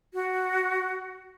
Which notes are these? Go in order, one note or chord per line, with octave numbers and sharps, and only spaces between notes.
F#4